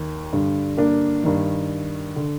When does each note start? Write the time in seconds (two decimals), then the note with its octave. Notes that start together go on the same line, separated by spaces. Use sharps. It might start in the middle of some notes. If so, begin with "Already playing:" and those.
Already playing: D#2 D#3
0.33 G2 D3
0.78 A#3 D4
1.24 G2 D#3
2.16 D3